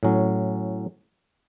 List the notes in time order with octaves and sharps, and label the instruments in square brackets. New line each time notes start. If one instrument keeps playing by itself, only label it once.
[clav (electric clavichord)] A2 F#3 C#4